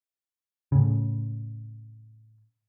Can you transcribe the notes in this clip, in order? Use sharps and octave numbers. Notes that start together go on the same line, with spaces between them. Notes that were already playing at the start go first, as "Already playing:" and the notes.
A2 C#3